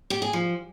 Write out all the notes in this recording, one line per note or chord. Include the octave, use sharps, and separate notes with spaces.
G4
G#4
F3